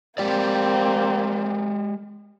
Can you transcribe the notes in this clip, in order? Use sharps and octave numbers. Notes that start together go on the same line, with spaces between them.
G#3 A#3 C4 G4 D5